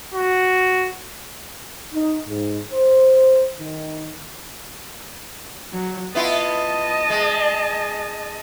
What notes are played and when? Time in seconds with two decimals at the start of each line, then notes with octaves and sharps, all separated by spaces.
0.14 F#4
1.93 D#4
2.28 G#2
2.72 C5
3.59 D#3
5.73 F#3
6.15 B3 E4 F4 D#5 A5
7.10 G#3